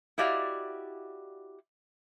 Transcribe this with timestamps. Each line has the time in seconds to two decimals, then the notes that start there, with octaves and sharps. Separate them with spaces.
0.18 E4 F#4 G4 D5 D#5 F5